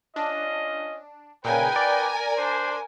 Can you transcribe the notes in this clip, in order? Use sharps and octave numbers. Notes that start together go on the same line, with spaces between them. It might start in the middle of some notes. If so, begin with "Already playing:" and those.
C#4 D4 F4 D#5
A#2 C#3 D#4 A#4 B4 G5 G#5
D5
D4 C5